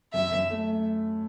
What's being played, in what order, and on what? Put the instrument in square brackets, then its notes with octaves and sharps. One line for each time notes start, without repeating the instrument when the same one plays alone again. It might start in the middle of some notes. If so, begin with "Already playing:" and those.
[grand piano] F#2 [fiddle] E5
[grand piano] F#2
A3